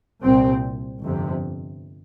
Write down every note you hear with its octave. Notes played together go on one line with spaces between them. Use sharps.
C2 A#2 C4
G1 F2 C3